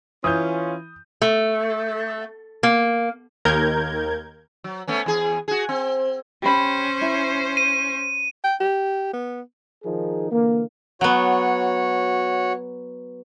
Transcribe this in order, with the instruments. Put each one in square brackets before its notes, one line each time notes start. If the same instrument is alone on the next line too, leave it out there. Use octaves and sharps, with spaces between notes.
[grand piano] E3 [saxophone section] C#4 F4 [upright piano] D#6 G6
[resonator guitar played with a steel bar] A3
A#3
[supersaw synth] D#2 A#4 G6 G#6
[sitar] F#3
A3 B3 C#4
E2 G#4
F#4 G#4
C4
[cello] C#4 C5 [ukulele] G4 B5
[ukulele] E4
[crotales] D#7
[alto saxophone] G5
G4
B3
[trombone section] D#3 F3 D#4 G#4 A#4
D3 E3 A#3
[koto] F#3 B3 [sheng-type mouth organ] F#4 C#5